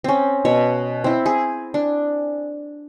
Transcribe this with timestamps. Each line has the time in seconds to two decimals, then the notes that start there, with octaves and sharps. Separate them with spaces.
0.04 C4 C#4
0.45 B2 C#5
1.04 C4 E4
1.26 G#4
1.74 D4